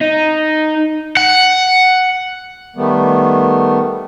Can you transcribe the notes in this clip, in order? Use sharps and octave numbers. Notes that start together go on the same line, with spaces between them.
D#4
F#5
D#3 G3 A3 B3